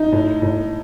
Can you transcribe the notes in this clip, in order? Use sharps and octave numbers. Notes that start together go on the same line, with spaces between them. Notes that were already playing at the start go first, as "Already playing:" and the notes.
Already playing: D#4
A2
A2